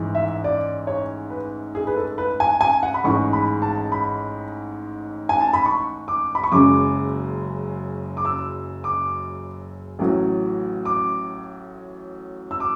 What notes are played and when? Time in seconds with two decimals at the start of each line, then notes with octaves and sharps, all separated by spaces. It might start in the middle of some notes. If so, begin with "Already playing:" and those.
Already playing: A1 G#2 E3
0.15 E5
0.44 D5
0.87 C#5
1.30 B4
1.75 G#4
1.87 B4
1.96 A4
2.18 B4
2.40 G#5
2.61 G#5
2.83 F#5
2.94 B5
3.04 A1 G#2 G#3 C#6
3.33 B5
3.62 A5
3.92 B5
5.29 G#5
5.41 A5
5.53 B5
5.66 C#6
6.08 D6
6.35 B5
6.44 C#6
6.52 F#1 F#2 C#3 G#3 D6
8.17 D6
8.25 E6
8.84 D6
9.99 A1 A2 F#3
10.85 D6
12.51 E6
12.60 D6